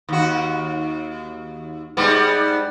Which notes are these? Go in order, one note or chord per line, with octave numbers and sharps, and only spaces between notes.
D#2 F#4
G#2 G3 B3